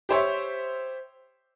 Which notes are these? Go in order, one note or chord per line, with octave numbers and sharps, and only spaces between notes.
G4 C5 C#5 E5